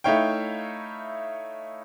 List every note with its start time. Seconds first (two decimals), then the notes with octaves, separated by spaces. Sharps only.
0.04 A3 D#4 E4 C#5 F5 G5